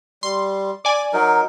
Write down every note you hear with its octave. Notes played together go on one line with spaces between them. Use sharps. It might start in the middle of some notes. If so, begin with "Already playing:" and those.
G3 C6
D5 G#5 D6
F#3 D#4 A#4